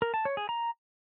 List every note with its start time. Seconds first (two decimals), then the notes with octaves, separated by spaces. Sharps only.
0.02 A#4
0.14 A5
0.25 C#5
0.37 G#4
0.49 A#5